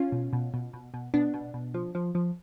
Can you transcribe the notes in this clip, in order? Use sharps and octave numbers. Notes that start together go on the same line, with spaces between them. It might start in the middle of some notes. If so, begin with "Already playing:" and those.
Already playing: C#4 F4
B2
B2
B2
B2
B2
B2 B3 D4
B2
B2
F3
F3
F3